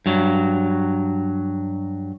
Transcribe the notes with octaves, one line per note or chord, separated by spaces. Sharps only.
G2 F#3